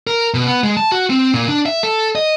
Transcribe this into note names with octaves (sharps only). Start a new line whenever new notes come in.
A#4
B2
B3
G#3
A5
F#4
C4
A#2
D4
E5
A4
D#5